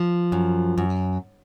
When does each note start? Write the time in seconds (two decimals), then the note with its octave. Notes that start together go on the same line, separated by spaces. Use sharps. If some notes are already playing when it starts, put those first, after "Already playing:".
Already playing: F3
0.32 F#2
0.78 F#2